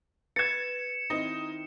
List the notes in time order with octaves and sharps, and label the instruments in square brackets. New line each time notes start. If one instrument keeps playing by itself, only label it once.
[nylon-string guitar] B4 [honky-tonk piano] G#6 A6 [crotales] C#7 E7
[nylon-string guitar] D#3 C4 E4 [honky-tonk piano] D#4